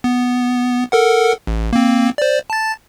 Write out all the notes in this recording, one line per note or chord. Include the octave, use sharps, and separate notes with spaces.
B3
A4 A#4 F#5
A1
A#3 C4
C5 D5
A5 A6